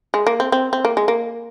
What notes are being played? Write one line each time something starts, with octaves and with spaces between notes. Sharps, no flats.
G#3
A#3
C4
C4
C4
A#3
G#3
A#3